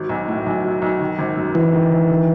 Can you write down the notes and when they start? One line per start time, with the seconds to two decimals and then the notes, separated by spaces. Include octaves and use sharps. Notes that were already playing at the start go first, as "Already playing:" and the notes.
Already playing: G#1 F#3
0.09 B1
0.28 A2
0.46 B1
0.64 F#3
0.82 B1
1.01 D#3
1.19 G#1
1.37 F#2
1.55 G#1 E3
1.73 D#3
1.91 G#1
2.09 D#3